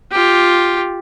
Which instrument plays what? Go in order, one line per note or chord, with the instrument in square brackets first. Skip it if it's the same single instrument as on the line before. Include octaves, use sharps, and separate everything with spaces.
[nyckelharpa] F4 G4